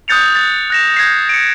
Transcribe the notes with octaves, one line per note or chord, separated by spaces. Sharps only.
D#6 F#6 G6 A6 C#7 F7
A6
F#6 A#6 E7
G6 G#6 A#6 C7
C#7 D7